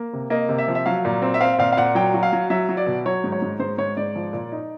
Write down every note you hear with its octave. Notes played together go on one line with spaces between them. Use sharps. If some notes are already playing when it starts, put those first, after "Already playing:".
Already playing: A#3
C3
A#3 D#5
C3
E5
F3
E5
F#3 F5
A#2
C4
E5
C4 F5
A#2 F5
F5
A#2 F#5
F#3 G5
F#3
F5
F#3
F#3 E5
F#3
D5
B2
F#3 C#5
G#2
C#5
G#2
G#2 C5
G#2 C#5
G#2 D5
F3
A#2
D#4